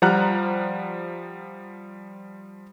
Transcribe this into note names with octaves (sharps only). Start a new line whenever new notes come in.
F3 G3 F#5 A#5 F6 F#6